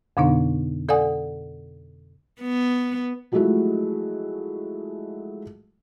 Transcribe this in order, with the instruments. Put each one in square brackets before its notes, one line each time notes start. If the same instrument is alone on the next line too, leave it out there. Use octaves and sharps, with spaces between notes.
[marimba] F2 B2 D3 B3 D4 D#4
A4 D5 F5 F#5 G#5 D#6
[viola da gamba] B3
[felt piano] F3 F#3 G#3 A3 E4 F#4